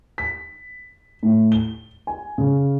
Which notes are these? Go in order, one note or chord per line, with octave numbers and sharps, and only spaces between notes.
B6
A2
G7
G#5
C#3